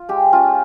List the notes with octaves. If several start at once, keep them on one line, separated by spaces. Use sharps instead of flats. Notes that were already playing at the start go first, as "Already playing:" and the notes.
Already playing: F4
G#3 G4
C#4 F4